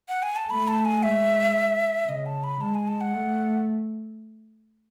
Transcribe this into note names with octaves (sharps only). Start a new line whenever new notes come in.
F#5
G#5
A5
A3 B5
A5
G#5
G#3 E5
C#3 D#5
A5
B5
G#3 A5
G#5
A5
F#5
A3